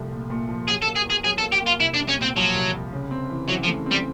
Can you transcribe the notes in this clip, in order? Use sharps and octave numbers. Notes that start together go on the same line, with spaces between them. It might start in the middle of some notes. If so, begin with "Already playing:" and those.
Already playing: C2 F3 A3
A#2
A#2
F3
F#3 G#4
A4
A#3
G#4
E2
G#4
F#3 G#4
A4
A#3
G4
A#3
F4
C2 E4
D4
C2
C#4
A#2 C4
F3 F#3
C2
C2
C#3
C4
E3
E3 F#3
F3
A3
G3 C4